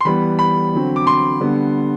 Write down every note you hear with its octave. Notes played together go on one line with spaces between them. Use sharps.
C6
E3 G3 B3 B5
B5
D3 F#3 C4
D6
C6
D3 G3 B3